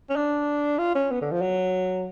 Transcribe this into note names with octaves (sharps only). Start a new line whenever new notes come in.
C#4
D4
F4
C#4
B3
D3
F3
F#3